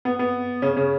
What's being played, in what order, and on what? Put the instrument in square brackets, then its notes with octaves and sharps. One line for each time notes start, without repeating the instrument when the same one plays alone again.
[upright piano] B3
B3
C#3 C#4
C#3 C#4